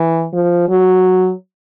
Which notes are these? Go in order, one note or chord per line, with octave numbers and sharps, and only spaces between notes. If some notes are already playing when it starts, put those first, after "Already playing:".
Already playing: E3
F3
F#3